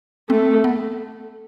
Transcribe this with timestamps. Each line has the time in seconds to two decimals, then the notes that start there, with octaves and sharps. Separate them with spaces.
0.29 A3 C4
0.64 B3